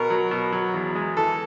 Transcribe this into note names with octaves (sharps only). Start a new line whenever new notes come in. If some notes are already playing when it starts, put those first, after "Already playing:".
Already playing: B2 A#4
F#3
B2
F#3
E2
G#3
E3 A4